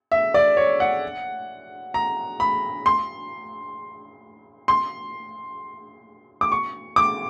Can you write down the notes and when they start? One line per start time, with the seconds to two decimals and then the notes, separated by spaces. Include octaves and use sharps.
0.12 E5
0.34 D5
0.57 C#5
0.80 F#5
1.94 A#5
2.40 B5
2.86 C6
4.68 C6
6.41 D6
6.52 C#6
6.96 D6